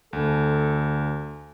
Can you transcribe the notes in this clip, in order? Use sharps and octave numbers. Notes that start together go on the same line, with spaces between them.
D2 A4